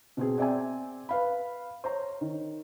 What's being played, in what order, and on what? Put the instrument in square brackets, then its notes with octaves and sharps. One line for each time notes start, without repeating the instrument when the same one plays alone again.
[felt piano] B2 C4 G#4
C4 D5 E5 G5 G#5
B4 F5 B5
C5 C#5 A#5
D#3